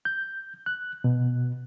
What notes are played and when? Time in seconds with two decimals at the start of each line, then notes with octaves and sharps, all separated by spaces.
0.05 G6
0.66 F#6
1.04 B2